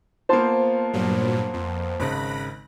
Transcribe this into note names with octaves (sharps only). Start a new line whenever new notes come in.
A#3 B3 F4 C5 A5 C6
G2 A#2 F#3
F2
G#1 C#3 B5 F#6 A#6